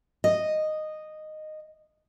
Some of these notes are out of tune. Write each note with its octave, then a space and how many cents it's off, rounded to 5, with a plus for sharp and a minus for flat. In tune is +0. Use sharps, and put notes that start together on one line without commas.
D#5 -10